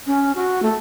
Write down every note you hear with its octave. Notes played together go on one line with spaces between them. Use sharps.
C#4
F#4
A3